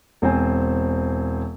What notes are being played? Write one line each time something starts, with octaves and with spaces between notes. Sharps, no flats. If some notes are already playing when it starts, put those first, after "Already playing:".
E1 C4 C5 G#5